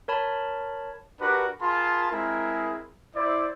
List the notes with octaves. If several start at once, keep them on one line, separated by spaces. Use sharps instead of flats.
A#4 C#5 A5 B5
D4 F#4 G4 A#4 B4
F4 G#4 A#4 A5 B5 C6
G#3 C4 E4 G#4 A#4
E4 C5 D5